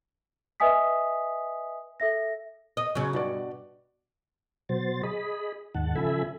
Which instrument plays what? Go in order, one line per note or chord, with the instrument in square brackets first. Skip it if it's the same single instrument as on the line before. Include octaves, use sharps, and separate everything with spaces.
[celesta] B4 D#5 E5 G#5 D#6 B6
A4 E5 A#6
[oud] D#5
C#3 F#3
[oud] G2 [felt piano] B2 F#4 D5
[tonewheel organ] B2 F#3 C5 A6
G#4 D#5 B5
D#2 G#2 D#3 F#5 A5
C#3 F3 A4 E5 G#5 B5